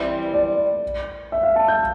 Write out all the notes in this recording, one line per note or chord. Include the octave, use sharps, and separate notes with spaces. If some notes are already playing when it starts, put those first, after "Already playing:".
Already playing: E3 G3 C4
D5
D5
E5
F5
A5
G6